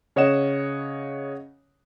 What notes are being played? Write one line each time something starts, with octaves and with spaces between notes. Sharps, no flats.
C#3 C#5 D#5 F#5 E7